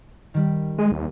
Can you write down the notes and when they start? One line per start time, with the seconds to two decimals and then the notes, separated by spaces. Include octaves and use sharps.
0.34 D#3 G3
0.79 G#3 D#7
0.92 D#2